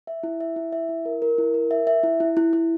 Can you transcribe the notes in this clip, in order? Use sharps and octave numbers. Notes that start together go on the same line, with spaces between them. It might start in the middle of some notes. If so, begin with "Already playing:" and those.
E5
E4
E5
E4
E5
E4
A#4
A#4
E4
A#4
E5
E5
E4
E4
E4
E4